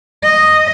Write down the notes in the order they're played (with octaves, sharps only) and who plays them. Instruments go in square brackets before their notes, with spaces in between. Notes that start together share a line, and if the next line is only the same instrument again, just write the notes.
[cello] D#5